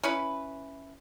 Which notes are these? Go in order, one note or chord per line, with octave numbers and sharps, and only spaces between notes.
C#4 E4 B4